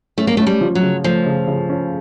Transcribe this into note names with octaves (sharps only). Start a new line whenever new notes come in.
A3 C#4
A#3
A3
C#4
G3
F3
F#3
C#3
F3 A3
C#3
C#3
C#4